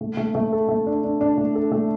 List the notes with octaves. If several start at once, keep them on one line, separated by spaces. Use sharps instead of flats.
A3
A3
A3
A4
A3
D4
D4
D4
A3
A4
A3